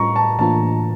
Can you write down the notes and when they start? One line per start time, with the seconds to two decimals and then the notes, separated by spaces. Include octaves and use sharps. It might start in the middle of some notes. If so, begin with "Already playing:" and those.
Already playing: A2 G3 C#4 F4 A#5 C#6
0.16 A5
0.39 A2 E3 A#3 D4 F4 A5